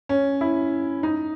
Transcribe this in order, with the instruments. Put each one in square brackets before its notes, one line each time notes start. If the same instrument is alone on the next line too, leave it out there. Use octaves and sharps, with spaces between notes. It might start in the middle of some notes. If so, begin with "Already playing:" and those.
[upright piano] C#4
E4
D#4